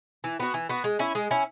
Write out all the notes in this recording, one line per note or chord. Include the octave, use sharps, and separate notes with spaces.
E3
B3 F#4
E3
B3 F#4
G#3
C#4 E4
G#3
C#4 E4